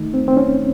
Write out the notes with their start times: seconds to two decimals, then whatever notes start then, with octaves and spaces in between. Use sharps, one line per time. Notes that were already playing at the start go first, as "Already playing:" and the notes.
Already playing: D#3 A3 D#4
0.14 C4
0.28 C4
0.37 C#4